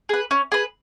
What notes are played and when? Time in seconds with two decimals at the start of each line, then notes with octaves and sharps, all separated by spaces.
0.09 G#4 B4
0.31 C#4
0.52 G#4 B4